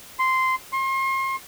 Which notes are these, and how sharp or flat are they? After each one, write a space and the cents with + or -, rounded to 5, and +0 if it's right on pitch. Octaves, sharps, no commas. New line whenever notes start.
C6 -10
C6 +35